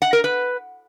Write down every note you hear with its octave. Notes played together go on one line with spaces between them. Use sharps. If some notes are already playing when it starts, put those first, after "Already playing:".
F#5
A#4
B4